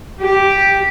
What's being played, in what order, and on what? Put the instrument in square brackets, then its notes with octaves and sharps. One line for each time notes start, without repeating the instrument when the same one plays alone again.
[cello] G4